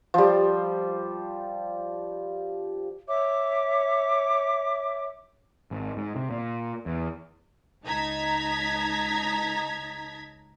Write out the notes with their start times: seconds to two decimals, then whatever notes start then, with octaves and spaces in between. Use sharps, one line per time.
0.14 F3 G3
3.08 C#5 E5 D6
5.71 G#1
5.97 G#2
6.16 C3
6.31 A#2
6.86 E2
7.84 C#2 D#4 A5 A#5 G#6 B6